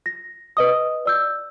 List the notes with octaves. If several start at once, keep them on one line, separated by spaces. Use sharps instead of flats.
A#6
B4 D#5 D#6
D5 E6 G6